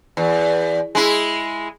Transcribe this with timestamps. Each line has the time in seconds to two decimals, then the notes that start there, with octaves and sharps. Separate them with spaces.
0.17 E2
0.95 G#3 E4